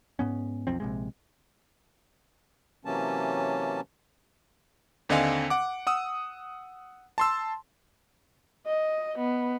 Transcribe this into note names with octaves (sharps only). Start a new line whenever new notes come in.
G#2 B3 C#4
B1 F2 F3 C4
A#1 C3 G#3
C3 E3 F#3 A#3 C#4 A5
D#2 D3 C4 D#5 F5 G#5
F#5 D6
F#5 D#6 E6
A5 C6 E6
D#5
B3